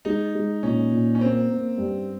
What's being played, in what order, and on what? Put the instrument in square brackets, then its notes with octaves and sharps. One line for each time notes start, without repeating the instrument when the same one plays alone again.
[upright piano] G#3 [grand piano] D#4
[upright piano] G#3
[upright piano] A#2 [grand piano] C#4
[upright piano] A#2
[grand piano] C#4
[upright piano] A#3 [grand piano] C4
[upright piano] A#3
G2